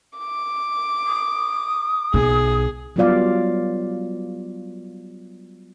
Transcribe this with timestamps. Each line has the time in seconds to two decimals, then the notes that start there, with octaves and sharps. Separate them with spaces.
0.18 D6
1.06 D#6
2.14 B1 G#4
2.96 F#3 G3 B3 F4 D5 F5